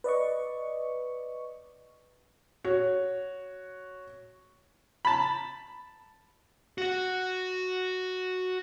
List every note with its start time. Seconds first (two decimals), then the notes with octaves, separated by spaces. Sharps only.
0.04 B4 D5 D#5 C#6
2.64 F#4 C#5
5.05 A5 B5
6.78 F#4 F#5